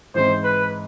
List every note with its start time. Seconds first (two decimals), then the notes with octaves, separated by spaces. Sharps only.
0.15 G#2 E3 G#3 C4 C5
0.43 B4